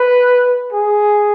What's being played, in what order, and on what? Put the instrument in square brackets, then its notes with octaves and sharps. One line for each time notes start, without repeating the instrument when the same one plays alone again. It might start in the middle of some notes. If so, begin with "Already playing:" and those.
Already playing: [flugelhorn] B4
G#4